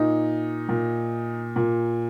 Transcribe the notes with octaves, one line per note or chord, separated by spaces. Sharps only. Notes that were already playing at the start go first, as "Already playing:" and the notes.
Already playing: A#2 D#4
A#2
A#2